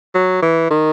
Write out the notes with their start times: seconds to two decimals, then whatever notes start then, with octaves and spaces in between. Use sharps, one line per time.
0.15 F#3
0.42 E3
0.71 D#3